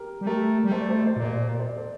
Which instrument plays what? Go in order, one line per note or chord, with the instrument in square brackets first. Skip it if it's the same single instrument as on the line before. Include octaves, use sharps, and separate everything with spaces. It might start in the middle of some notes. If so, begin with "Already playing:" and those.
Already playing: [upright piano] G4 A#4
[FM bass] G3
[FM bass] A3 [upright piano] G4 A#4
[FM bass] G3
[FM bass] A3 [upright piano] C5
[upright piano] D5
C5
D5
C5
[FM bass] A#2 [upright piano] D5
[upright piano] C5
D5
C5
D5
C5
D5
A4 C5